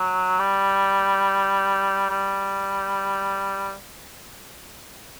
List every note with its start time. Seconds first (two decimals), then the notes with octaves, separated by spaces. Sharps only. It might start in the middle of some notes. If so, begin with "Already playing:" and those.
Already playing: F#3
0.39 G3
2.10 G3